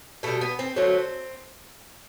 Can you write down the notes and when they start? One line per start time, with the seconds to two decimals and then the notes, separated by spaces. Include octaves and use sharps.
0.23 B2 G3 A3
0.41 B3
0.59 C4
0.76 D3 F#3 A3 C4